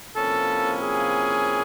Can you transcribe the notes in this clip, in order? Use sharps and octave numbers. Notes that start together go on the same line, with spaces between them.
C3 F3 A#3 C#4 E4 A4
G#4